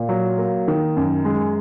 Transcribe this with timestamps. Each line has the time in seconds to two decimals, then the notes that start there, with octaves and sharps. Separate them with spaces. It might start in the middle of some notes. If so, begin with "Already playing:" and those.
Already playing: A#2
0.09 F#3
0.38 A#3
0.68 D#3
0.97 F#2
1.25 G#3